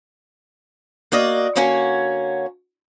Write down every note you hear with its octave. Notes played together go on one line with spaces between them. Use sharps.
A#3 F#4 D5 D#5
D3 A#3 C#4 F#4 C#5